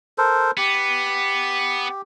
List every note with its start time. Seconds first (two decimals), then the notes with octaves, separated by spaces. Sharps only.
0.18 A4 A#4 C5
0.57 B3 G4